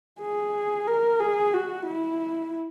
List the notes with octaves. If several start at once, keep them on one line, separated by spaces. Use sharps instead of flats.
G#4
A#4
G#4
F#4
E4